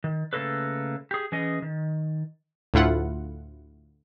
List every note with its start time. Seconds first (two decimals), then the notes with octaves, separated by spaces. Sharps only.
0.04 D#3
0.33 C#3 G3 A3 A#3 A4 B4
1.11 G4 G#4
1.32 E3 C#4 G#4 D#5
1.62 D#3
2.74 D2 A2 A3 E4 F4 F#5